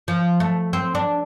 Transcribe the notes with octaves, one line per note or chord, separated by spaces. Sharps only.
F3
A3
C4
D4